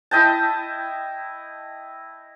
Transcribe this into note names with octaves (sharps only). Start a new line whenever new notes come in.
E4 D#5 G5 A5